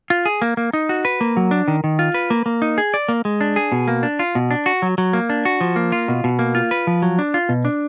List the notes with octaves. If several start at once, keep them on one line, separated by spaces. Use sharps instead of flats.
F4
G#4
A#3
A#3
D#4
F#4
B4
A#3
F#3
D4
D#3
D#3
F4
B4
A#3
A#3
D#4
G#4
D5
A#3
G#3
D4
G#4
B2
A#3
D4
F4
B2
D4
F#4
F#3
F#3
A#3
D4
F#4
F3
A#3
F4
B2
B2
A#3
F4
B4
F3
F#3
D4
F4
B2
D4